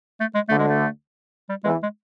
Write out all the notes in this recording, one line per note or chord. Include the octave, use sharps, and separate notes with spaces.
A3
G#3
D2 D3 A3
G#3
A3
G3
E2 E3 G#3
G#3